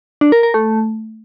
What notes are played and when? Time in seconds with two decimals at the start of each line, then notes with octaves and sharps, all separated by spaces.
0.21 D4
0.32 A#4
0.43 A#4
0.54 A3